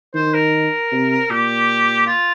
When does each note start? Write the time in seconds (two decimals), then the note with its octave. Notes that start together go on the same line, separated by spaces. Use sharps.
0.15 D#3 C5
0.34 A#4
0.92 C3
1.30 A#2 G4
2.07 F4